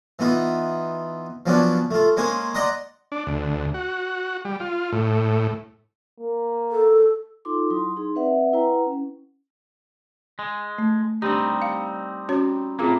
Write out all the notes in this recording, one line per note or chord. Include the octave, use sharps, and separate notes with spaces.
E3 B3 D#4 F4
F3 F#3 B3 C#4 D4 F4
A3 F4
G#3 A#3 C#4 C5 G#5
D5 D#5 F#5 A#5 C6 D#6
D4
D2
F#4
G3
F4
A2
A#3
A4
D#4 F4 A4 C6 D6
F#3 E4 C6 D#6
D#4 G#4 C6
C4 B4 D5 E5 F#5
E4 B4 F#5 G5 A#5
C#4
G#3
A3
G3 C4 D4 D#4 G4
F5
C#4 F#4 C#5
A2 A#3 C4 F4 G#4